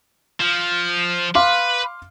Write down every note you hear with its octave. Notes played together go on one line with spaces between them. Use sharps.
F3
B4 F5 C6 D6